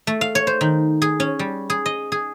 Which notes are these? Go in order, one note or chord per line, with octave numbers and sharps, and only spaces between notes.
A3
F5
C#5
C5
D#3
G#4
C#4
G3
G#4
D#5
G#4